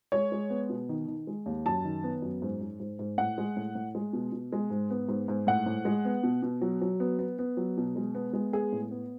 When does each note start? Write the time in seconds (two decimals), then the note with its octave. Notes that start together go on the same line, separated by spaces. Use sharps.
0.12 G#3 C#5
0.32 G#3
0.50 B3
0.69 B2
0.89 D#3
1.07 D#3
1.27 G#3
1.46 D#2
1.66 F#2 A5
1.85 D#3
2.03 B3
2.22 F#2
2.42 G#2
2.61 G#2
2.80 G#2
2.99 G#2
3.18 A2 F#5
3.38 G#3
3.57 A2
3.75 A2
3.95 G#3
4.13 B2
4.32 B2
4.52 G#3
4.70 G#2
4.90 B3
5.09 G#2
5.28 G#2
5.47 A2 F#5
5.66 A2
5.85 G#3
6.05 B3
6.23 B2
6.43 B2
6.61 F#3
6.81 F#3
7.00 B3
7.19 B3
7.39 B3
7.57 F#3
7.77 B2
7.96 G#3
8.15 B3
8.33 G#3
8.53 B3 G#4
8.72 A2
8.91 B3